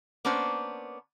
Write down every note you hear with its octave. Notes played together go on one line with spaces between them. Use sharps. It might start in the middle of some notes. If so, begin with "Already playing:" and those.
A#3 B3 C#4 D4 C5